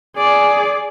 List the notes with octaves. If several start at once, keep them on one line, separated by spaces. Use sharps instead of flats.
G#4 D5